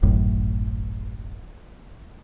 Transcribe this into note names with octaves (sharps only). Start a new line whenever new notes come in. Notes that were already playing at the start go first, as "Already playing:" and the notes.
D1 G#1 F#2 A2